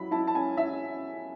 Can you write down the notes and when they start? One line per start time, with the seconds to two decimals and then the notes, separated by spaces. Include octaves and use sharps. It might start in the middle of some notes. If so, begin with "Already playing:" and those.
Already playing: F#3 E4 B5
0.11 E4 A5
0.27 A5
0.35 C#4 G#5
0.57 E4 E5